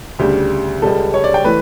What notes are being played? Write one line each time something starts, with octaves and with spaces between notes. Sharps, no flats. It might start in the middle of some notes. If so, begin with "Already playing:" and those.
D2 C#3 G3 G4
C#2 C#3 G3 A4
C#5
D5
G5
E3 A3 B4